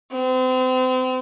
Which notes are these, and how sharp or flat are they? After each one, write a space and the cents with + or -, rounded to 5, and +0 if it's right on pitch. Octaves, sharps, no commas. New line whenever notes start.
C4 -35